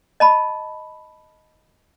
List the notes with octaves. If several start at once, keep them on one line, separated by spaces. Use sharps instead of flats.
D#5 A5 B5